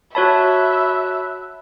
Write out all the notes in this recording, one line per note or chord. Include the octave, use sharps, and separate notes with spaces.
F#4 C#5 E5 A5 B5 F#6